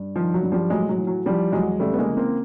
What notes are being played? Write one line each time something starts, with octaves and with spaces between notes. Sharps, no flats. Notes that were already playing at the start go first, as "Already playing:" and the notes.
Already playing: G2
D#3 F3
F#3
G2
F3 G3
A2 F#3 G#3
F#3
E3
F#3
E3 F3 G3
E2 F#3 G#3
C#3 G3 A3
B3
G#3 A#3
E3
A#3 C4